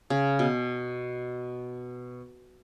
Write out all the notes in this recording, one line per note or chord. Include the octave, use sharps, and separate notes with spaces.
C#3
B2